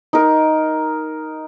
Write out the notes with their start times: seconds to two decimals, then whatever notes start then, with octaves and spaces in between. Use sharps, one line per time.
0.13 D#4 A#4